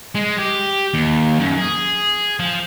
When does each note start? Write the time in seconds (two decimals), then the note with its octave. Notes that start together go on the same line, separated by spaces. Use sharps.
0.15 G#3
0.38 G4
0.94 D#2
1.40 F#2
1.58 G#4
2.40 F3